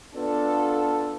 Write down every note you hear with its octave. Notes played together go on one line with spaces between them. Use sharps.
B3 D4 F4 A4